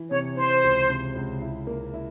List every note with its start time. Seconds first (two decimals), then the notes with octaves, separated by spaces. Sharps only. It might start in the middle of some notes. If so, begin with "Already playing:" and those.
Already playing: E3
0.11 C3 C#5
0.36 E3 C5
0.64 C#2
0.89 C3
1.15 C#2
1.41 E4
1.67 A#3
1.94 E4